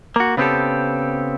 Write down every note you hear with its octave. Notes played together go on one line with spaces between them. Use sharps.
A#3 F#4
C#3 B3 C4 F#4 G4 A4